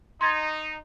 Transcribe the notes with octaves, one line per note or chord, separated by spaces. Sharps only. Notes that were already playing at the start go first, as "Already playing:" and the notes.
D#4 C6 G#6 A6